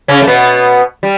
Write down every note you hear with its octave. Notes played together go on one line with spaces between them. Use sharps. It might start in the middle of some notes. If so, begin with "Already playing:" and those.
C#3 C#4
A3
B2 B3
G3